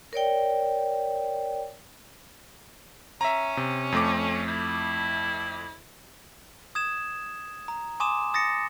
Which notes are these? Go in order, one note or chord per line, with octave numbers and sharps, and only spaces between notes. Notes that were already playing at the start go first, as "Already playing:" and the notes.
A#4 C#5 D5 G5
C#4 E5 A#5
C3
F2 A3 D6
E4
D#6 G#6 E7
A#5
G#5 C6 D6 D#6 E7
D#6 A6 A#6 C#7